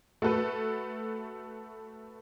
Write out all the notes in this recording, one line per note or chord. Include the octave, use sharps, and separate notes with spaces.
A3 F#4 A4 B4